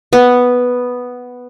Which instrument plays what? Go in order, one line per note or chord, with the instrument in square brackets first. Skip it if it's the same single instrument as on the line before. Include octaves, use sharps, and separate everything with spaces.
[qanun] B3